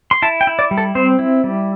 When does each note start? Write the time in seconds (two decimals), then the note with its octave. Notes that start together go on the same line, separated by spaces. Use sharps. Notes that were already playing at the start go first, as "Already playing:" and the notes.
0.11 C6
0.22 E4 A5
0.41 G5
0.47 E4
0.59 D5
0.71 G3
0.78 A4
0.95 C4 C5
1.19 E4
1.44 G3